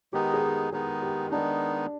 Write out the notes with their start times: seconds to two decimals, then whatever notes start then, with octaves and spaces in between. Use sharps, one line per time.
0.13 D#3 G#3 B3 D#4 G4
0.34 G#4
0.43 G4
0.72 D#3 G#3 B3 D#4 G#4
1.02 G4
1.30 D#3 G#3 B3 D4 D#4